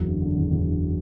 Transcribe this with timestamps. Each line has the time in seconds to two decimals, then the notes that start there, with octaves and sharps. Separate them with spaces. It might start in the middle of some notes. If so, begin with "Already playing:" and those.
Already playing: F#1 E2 F#3
0.08 D3
0.22 D3
0.36 E2
0.51 E2
0.66 D3